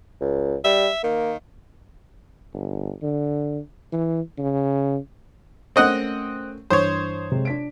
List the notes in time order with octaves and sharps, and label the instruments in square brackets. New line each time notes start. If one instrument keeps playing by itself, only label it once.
[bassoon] C#2
[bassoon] G3 [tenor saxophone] E5
[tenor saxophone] D#3 [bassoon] A#3
[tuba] G1
D3
E3
C#3
[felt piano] A3 C#4 A#4 [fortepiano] C4 D#5 F#5
[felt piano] G2 E3 D#6 [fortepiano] C5 C#5
[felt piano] C3 G#3
D4 B6 D7